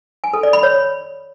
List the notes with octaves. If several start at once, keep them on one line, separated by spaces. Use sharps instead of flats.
G#5
A4
D5
B5
C#5